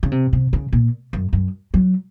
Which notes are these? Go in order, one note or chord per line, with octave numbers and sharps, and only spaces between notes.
C#3
C3
C3
C#3
A#2
F#2
F#2
F#3